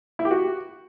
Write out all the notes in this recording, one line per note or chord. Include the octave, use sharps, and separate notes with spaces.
E4
G4
F#4